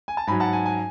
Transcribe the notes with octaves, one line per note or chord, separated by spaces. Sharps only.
G#5
A5
G#2 F#3 G#5 B5
F#5 A5
G#5
G#5